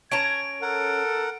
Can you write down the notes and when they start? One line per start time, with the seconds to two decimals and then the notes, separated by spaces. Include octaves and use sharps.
0.12 C#4 A5 A#5 G#6 D7
0.62 A4 A#4 F#5